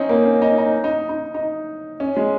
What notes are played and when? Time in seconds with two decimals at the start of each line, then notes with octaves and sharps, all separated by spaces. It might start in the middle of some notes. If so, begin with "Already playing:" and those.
Already playing: C4 C#4 D#4
0.09 A#3
0.25 C#4
0.42 D#4
0.58 D#4
0.84 D#4
1.09 D#4
1.34 D#4
2.00 C#4
2.17 G#3